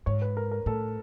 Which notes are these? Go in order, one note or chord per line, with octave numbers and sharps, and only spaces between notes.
G#2 C#5
B4
A#4
A#4
A2 A4